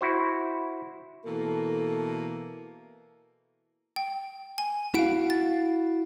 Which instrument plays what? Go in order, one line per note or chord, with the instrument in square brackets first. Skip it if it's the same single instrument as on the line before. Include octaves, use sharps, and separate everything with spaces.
[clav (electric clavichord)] E4 F#4 C5
[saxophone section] B2 E3 A#3 [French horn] A4
[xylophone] G5
G#5
[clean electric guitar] E4 F#4 F5 [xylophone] F#5 D7
[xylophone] A6